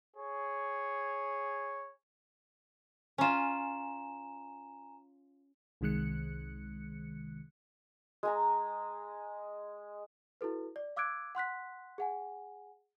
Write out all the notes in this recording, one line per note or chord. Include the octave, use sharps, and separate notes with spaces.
G#4 C#5
C#4 F4 G#5 A#5 E7
C2 C3 D#3 G#3 F#6 C#7
G#3 G#5 A#5
E4 F#4 A4 B4
D5
F5 D6 E6 F#6 G#6 D7
F#5 C6 F#6 B6
G#4 F#5 G#5